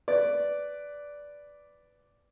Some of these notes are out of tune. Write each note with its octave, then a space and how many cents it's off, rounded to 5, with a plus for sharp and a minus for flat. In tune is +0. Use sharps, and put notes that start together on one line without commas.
B4 +10 D5 -5